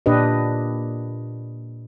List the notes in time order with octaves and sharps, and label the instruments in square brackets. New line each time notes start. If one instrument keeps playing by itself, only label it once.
[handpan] A#2 D4 G4 B4 D#5